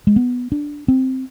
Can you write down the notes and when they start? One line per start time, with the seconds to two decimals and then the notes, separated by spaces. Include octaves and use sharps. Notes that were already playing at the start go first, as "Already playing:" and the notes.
0.07 G#3
0.16 B3
0.52 D4
0.88 C4